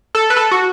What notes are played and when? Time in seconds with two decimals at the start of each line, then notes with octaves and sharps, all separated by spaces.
0.15 A4
0.30 B4
0.36 A4
0.51 F#4